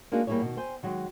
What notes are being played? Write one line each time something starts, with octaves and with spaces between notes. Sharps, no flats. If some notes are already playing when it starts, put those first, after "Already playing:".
G#3 A#3 D4 D#4 F#4 G#4
G3 A#3 D4 E4 G#4 C#5
B2 D#3
C5 G5 G#5
D#3 F#3 G#3